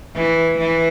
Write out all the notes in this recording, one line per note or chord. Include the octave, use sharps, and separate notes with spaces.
E3
E3